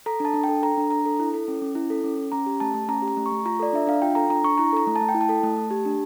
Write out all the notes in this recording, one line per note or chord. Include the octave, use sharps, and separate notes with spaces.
A4 A#5
D4 A5
D4
G5
A4
A4 A#5
D4
D4 A#5
A4
E4
A4
C#4
C#4
E4
A4
C#4
C#4
C#4 A#5
G4
A3 A5
A3
C#4 A#5
G4
A#5
A3
C#6
A3
F4 A#5
A4 D5
D4 E5
D4 F5
F4 G5
A4 A#5
D4 A#5
D4 C#6
E4 A#5
A4 A#5
A3
A5
A3
G5
E4
A5
A4
A3
A3
G4
D4